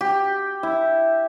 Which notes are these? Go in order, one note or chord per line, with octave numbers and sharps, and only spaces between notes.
G4
E4